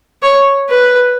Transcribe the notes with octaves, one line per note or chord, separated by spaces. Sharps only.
C#5
B4